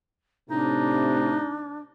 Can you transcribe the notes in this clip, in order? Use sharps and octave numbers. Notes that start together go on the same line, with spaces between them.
A2 C3 D4 D#4